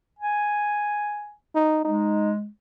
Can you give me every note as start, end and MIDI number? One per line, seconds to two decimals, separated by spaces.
0.19 1.33 80
1.55 1.81 63
1.85 2.47 56
1.85 2.31 63